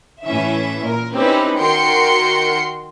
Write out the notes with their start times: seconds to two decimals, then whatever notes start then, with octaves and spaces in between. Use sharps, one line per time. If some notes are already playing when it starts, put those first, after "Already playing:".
0.23 A2 E3 C#4 E5
0.82 A#2 A#4
1.12 C4 C#4 D#4 E4 G4 B4
1.56 D#3 F#4 A#4 G5 C6 C#7